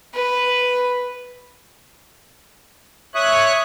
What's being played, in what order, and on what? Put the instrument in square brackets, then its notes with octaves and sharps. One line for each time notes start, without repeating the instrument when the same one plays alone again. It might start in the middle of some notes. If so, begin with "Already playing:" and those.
[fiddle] B4
[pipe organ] C#5 F#6 [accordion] E5 C#6 D#6